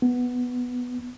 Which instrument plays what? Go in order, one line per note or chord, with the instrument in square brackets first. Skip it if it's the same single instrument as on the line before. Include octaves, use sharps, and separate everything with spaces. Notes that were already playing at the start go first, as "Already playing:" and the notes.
[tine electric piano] B3